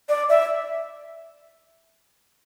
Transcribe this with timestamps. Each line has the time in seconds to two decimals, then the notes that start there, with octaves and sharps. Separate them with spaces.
0.09 D5
0.29 E5